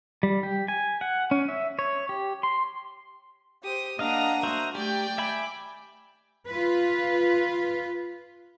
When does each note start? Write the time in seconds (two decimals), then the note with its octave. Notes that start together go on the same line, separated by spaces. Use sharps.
0.23 G3
0.43 G4
0.68 G#5
1.01 F#5
1.31 C#4
1.48 E5
1.79 C#5
2.09 G4
2.43 C6
3.64 G4 C5 D#6
3.99 A#3 D4 D#5 F5 F#5 A#5 D#6
4.43 F#4 C5 E5
4.75 A3 G4 D5 G5
5.18 E5 G#5 B5 D6
6.49 F4 B4